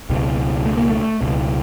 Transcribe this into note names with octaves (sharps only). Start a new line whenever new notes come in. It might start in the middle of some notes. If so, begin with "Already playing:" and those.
C#2 B2
A3
A#3
A3
C#2 B2